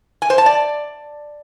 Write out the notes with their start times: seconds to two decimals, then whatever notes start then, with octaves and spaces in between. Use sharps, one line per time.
0.22 G#5
0.30 C5
0.38 A5
0.46 D5